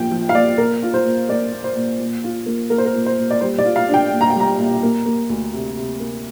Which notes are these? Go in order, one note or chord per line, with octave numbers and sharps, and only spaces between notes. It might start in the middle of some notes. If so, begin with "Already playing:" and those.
Already playing: A#2 F3 G5
F3
F5
A#2 D5
A#2 A#4
F4
C5
A#2
A#3 D5
A#2
C5
A#2
A#2
F4
A#3
A#3 A#4
C5
A#4
A#2
C5
A#2
D5
G3 C5
D5
F4
F5
D4 G5
A#2
A#5
G5
G3 A#5
A#2
A#3
A#3
D2
C3
C3
A#3